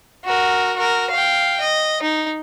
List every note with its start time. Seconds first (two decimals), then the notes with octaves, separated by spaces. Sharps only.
0.25 F#4 A#4
0.76 F#4 A#4
1.11 F5 G5
1.60 D#5
2.02 D#4